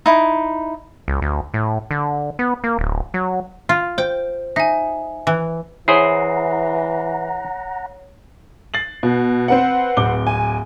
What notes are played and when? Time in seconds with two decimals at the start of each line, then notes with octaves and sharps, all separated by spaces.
0.06 D#4 E4
1.08 C#2
1.22 D2
1.54 A2
1.91 D3
2.39 B3
2.64 A#3
2.79 D1
3.14 F#3
3.69 F4
3.98 C5 G5
4.56 D#4 E5 G#5
5.27 E3
5.88 E3 E4 G#4 C5 C#5 F#5 A#5 C7
8.74 A6 C7 F#7
9.03 B2
9.48 C4 B4 F#5
9.97 D1 D6 G7
10.27 G#5